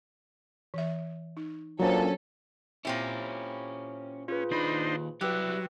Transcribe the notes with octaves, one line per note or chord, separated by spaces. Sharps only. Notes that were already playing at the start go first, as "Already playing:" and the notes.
E3 E5
D#4
A#2 F#3 C#4 D4 A4 C5 A#5
A#2 C4 C#4 E4 G4
C#4 F4 G#4 B4
D#2 D4 D#4 C5 B5
F#3 G3 E4 G4 B4 E6 F#6